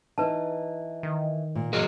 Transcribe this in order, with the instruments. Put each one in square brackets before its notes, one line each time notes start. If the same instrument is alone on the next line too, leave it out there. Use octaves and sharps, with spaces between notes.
[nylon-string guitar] E3 D#4 [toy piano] B4 A5
[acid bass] D#3
[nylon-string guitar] A#2
[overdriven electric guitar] F#3 G#3 [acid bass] A#4